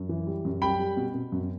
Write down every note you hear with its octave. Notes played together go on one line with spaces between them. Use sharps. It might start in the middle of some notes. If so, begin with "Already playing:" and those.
Already playing: F#2
E3
G3
F#2
G3 G5 B5
G3
B2
B2
F#2